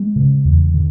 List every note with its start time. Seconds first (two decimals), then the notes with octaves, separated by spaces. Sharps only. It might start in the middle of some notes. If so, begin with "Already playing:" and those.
Already playing: G#3
0.16 C#3
0.45 E2
0.74 D3